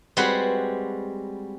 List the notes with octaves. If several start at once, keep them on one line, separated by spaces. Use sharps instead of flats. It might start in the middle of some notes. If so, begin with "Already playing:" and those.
G3 G#3 C4 F#4 B4 F#5